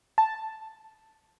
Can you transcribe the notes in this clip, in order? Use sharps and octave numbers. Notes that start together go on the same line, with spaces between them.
A5